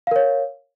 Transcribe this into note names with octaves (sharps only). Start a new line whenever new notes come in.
A#4 C#5 F5